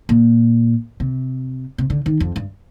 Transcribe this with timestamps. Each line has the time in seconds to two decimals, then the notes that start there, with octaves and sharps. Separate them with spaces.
0.09 A#2
1.00 C3
1.78 C3
1.90 D3
2.06 D#3
2.20 F2
2.36 G2